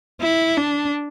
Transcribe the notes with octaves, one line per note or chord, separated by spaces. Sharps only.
E4
D4